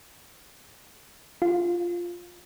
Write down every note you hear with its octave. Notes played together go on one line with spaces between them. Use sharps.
F4